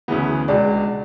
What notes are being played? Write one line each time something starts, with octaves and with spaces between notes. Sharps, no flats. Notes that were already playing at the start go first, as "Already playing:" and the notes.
D2 C#3 E3 B3
C#2 B2 G#3 D4 D5